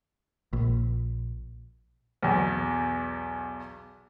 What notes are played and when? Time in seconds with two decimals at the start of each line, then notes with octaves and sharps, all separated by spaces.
0.53 A#1
2.23 B1 E2